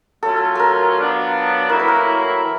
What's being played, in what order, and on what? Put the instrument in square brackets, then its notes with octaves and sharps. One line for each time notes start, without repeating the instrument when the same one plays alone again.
[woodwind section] F#3 A3 C#4 F4 [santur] A4
[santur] A4 A#4
[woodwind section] F#3 B3 D4 F4
[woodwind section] A2 F#3 A#3 C#4 E4 [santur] A#4
[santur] B4
A#4
[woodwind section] E3